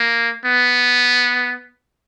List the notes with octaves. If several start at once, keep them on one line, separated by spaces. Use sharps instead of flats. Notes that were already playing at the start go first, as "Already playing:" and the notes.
Already playing: A#3
B3